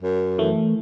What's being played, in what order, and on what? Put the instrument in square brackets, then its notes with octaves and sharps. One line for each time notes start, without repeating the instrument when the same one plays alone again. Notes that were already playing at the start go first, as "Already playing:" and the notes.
[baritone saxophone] F#2
[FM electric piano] E3 A3